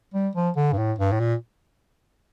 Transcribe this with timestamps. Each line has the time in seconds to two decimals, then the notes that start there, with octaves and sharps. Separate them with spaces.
0.14 G3
0.35 F3
0.56 D3
0.73 G2
0.78 A2
0.98 G2
1.12 A2
1.20 A#2